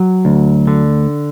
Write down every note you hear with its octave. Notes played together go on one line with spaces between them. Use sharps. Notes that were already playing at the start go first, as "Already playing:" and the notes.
Already playing: F#3
D2
D3